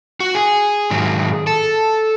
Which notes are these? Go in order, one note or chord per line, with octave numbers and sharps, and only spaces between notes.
F#4
G#4
G#2 D#3 F#3
A4